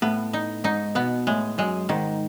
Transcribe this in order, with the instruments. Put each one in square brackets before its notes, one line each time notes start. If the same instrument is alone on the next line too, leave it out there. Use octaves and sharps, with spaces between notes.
[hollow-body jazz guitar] A2 [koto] B3
[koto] D#4
[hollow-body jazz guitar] G#2 [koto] D#4
[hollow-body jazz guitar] B2 [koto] B3
[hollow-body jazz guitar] A2 [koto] G#3
[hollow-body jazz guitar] F#2 [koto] G#3
[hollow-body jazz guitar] G#2 [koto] D#3